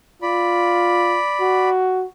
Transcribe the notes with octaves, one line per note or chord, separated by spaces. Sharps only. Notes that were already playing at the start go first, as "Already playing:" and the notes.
F4 D5 B5
F#4